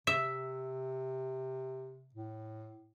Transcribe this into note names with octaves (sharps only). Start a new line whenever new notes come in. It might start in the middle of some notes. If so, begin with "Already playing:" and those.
C3 E5
A2